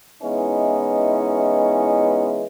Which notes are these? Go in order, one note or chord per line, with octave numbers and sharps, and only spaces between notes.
E3 G#3 B3 C#4 D#4 E4